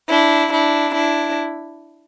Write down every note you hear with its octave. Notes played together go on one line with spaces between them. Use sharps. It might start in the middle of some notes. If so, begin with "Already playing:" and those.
D4 E4
D4 E4
D4 E4